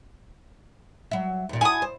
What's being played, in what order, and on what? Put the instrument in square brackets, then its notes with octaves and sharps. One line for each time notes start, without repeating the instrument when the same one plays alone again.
[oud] F#3 E5
D#2 A#2
[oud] E4 F#4 [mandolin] G#5 D#6
[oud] C5